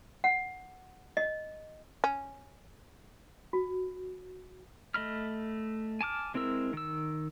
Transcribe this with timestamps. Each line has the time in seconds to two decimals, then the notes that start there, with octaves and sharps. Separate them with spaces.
0.24 F#5
1.17 D#5
2.04 C#4
3.53 F#4
4.94 A3 D#5 B5 F6
6.01 G#5 A5 D6 F6
6.34 G#3 C4 E4 A#4 E6
6.73 D#3 E6